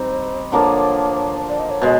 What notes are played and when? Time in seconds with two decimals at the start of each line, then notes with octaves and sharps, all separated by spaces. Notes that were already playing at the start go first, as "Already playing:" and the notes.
Already playing: G3 C4 D#4 C5
0.51 D3 F3 A#3 D4 C#5
1.49 D5
1.59 D#5
1.70 C#5
1.82 B2 G#3